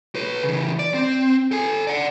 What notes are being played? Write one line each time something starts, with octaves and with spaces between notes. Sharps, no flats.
B4 C#5
C#3 E3
D5
C4
A4 G#5
D5 F#5